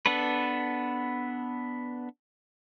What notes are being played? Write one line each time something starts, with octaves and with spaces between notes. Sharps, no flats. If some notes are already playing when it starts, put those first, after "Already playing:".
B3 D4 A4 B4